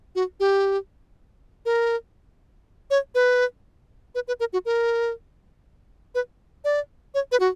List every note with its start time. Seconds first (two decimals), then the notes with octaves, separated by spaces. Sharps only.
0.15 F#4
0.40 G4
1.66 A#4
2.90 C#5
3.15 B4
4.15 B4
4.28 B4
4.40 A#4
4.53 F#4
4.65 A#4
6.15 B4
6.64 D5
7.14 C#5
7.32 B4
7.40 F#4